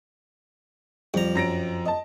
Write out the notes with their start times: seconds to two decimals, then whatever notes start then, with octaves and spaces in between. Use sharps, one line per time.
1.14 F2 G3 A#5
1.35 F#2 A#6 D7
1.86 D#5 A5